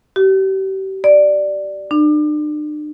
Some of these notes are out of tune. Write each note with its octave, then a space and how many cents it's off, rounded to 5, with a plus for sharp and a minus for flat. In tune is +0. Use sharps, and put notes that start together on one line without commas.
G4 -35
D5 +5
D4 +45